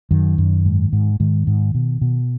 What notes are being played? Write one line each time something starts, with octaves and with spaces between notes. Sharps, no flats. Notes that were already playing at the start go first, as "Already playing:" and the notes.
F#2 D#3
F#2
G#2
G#2
G#2 D#3
G#2
B2
B2